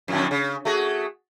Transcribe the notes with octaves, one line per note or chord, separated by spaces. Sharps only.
F2 A2 D3
C#3
A3 F#4 G#4